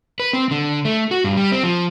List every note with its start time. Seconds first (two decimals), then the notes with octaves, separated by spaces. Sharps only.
0.20 B4
0.33 C4
0.51 D3
0.85 A3
1.11 F#4
1.24 G2
1.37 G3
1.52 C4
1.63 F3